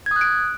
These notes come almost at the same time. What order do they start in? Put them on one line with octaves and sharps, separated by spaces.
G#6 D#6 F#6 D7